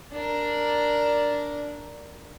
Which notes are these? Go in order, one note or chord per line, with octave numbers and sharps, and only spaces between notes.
D4 A#4